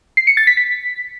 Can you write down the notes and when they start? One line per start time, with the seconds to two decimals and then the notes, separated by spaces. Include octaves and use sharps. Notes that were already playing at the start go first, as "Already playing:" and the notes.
0.17 C7
0.27 C#7
0.37 A6
0.47 B6
0.57 B6